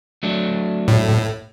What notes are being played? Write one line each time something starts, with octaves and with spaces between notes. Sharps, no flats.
F#3 A3 D4
A2